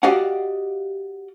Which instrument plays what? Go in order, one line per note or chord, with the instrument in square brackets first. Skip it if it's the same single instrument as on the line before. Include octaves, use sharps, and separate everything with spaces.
[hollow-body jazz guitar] F#4 G4 D5 D#5 F5 F#5